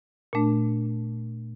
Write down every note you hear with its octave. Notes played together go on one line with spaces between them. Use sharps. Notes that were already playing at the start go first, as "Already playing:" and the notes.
A#2 A3 D4